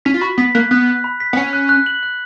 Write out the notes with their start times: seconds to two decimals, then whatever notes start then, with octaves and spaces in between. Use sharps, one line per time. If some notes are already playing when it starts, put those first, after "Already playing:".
0.05 C#4 B6
0.14 F4
0.21 F#4 B5
0.38 B3 B6
0.55 A#3 F#6
0.71 B3 F#6
0.87 F#6
1.04 B5
1.20 B6
1.33 B3
1.37 C#4 C#7
1.53 F#6
1.69 F#6
1.86 F#7
2.03 F#6